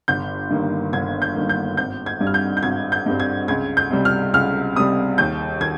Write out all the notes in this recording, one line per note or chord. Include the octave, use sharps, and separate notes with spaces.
G1 G6
G2 D#3 A#3
G1 G#6
G6
G2 D#3 A#3
G6
G#1 G6
G#6
G2 G3 C4
F6
G6
G6
G#1 G#6
G6
G2 G3 C4
G#6
C#2 G#6
G6
C3 G3
F6
C#2 F6
C3 G3 D#6
D#2 G6
D#3 G#6